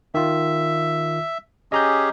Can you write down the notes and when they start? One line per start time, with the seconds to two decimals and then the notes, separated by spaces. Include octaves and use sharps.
0.14 D#3 F4 E5
1.72 C#4 G4 G#4 D#5 A#5 G6